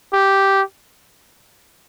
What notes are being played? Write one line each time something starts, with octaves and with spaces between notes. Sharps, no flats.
G4